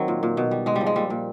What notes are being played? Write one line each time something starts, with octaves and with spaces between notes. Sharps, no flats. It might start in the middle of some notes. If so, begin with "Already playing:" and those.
Already playing: D#3 F#3 C4
A#2
A#2
B2
G3
G#2 G#3
G3
F3
G#3
A#2 G3
A#2